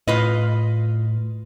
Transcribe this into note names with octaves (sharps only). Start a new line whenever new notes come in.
A2 F4 B4 D#5